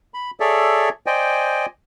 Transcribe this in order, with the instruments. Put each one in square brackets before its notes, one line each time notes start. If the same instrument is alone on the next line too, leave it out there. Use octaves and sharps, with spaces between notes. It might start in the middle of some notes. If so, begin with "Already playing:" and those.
[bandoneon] B5
G#4 A4 C#5 D5 E5
C5 D5 D#5 G5 G#5